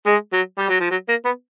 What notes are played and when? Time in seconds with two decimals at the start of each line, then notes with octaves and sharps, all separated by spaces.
0.06 G#3
0.33 F#3
0.58 G3
0.69 F#3
0.80 F3
0.91 F#3
1.09 A#3
1.25 B3